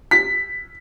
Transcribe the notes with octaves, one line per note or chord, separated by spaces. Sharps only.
B6